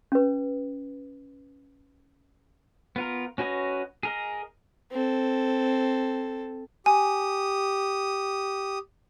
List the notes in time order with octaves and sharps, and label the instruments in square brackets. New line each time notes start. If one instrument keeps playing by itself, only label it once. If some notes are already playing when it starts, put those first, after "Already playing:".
[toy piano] C#4 B4
[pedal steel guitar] B3 F4 A#4
C#4 F#4 B4 C#5 D#5
G#4 A#4 D#5
[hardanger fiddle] C4 A4
[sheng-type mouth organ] G4 D#6 [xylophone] G#5